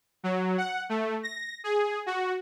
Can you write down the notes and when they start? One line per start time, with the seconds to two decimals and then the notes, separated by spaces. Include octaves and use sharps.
0.24 F#3
0.58 F#5
0.89 A3
1.23 A#6
1.64 G#4
2.06 F#4